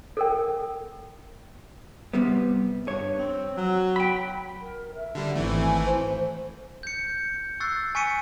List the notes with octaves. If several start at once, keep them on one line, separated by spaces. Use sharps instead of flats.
A4 A#4 G5
C3 G3 B3
G2 C#5
C4
F#3
G5 B5
A#4
E5
D3 G3
G#1 E3 A3 C4
G#5
C5
G6 C#7
C#6 E6 F#6 A6 C7
G#5 C#6 B6 C#7 D#7